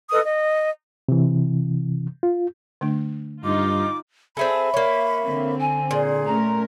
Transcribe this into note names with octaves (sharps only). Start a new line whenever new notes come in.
A4 B4 D#5 D#6
D#5
C3 E3
F4
D3 A3 D4
G2 D#4 F4 D6
C4 G#4 A4 E5 B5
A#3 C#5
D3 C4
G#5
A#2 G#4
A3 C#4 A#4 A#5